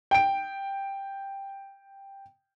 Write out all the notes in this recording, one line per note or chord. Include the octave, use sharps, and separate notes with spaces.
G5 D7